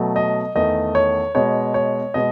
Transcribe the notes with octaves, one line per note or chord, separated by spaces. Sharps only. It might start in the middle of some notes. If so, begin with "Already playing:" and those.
Already playing: B2 F#3 A3
D#5
E2 D#3 A3 D#5
C#5
B2 G#3 C#5
C#5
B2 G#3 D#5